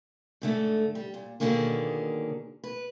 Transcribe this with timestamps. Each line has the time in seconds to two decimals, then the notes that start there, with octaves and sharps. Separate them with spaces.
0.42 G#2 D3 A3
0.95 G3
1.14 A#2
1.40 B2 D3 D#3 F#3 A#3 G#4
2.64 B4